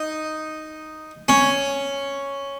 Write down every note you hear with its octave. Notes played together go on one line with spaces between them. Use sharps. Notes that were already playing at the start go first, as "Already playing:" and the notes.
Already playing: D#4
C#4